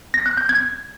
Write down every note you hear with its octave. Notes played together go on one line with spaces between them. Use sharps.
A#6
F#6
G6
G#6